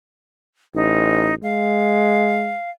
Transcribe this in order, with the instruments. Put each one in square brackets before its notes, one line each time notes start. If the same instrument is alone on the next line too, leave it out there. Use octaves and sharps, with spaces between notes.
[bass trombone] A1 [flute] D#4
[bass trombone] G#3 [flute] F5